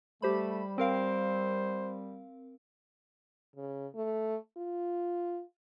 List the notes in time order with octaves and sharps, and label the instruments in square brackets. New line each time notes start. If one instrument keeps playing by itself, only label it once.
[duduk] G3 [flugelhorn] A3 [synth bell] G4 C5 B5
[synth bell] C4 A#4 F5 [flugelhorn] C5
[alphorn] C#3
A3
F4